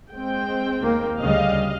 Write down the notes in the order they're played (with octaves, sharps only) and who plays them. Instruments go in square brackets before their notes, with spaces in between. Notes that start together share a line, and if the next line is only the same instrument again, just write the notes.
[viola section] G#3 C4 G5
[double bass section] D#2 A#3
[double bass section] D2 C#3 G3 [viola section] D#5 F5